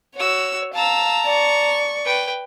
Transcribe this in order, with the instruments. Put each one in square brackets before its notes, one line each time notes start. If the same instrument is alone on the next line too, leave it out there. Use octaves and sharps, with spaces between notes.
[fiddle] F#4 E6 [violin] C#5
[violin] F5 E6 [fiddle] A5 A#5
[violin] D5 C#6
[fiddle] B4 G5